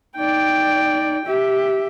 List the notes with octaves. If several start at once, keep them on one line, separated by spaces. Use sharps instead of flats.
D#4 D5 G5
G4 E5